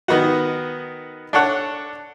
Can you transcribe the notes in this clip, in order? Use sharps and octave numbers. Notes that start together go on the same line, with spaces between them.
D#3 B3 D#4 F#4
D4 A4 C#5 F#5